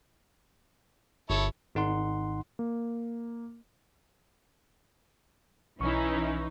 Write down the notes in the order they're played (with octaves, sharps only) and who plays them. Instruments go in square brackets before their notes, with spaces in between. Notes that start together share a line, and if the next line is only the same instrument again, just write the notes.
[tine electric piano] G1 [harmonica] E4 A4 C#5
[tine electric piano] G#1 D#4 F#5 C6
[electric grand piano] A#3
[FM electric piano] B1 C#6 [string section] E3 D#4 [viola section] C#4 E4